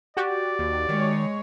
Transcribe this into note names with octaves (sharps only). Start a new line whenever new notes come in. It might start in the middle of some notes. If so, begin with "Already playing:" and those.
F#4 G4 D5
D#2
D#3 G#3 C#5